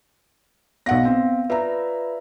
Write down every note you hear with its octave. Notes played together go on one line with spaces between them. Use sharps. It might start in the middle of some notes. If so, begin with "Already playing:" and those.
B1 B3 F5 F#5 A#6
C4
F4 B4 D5 E5 A#5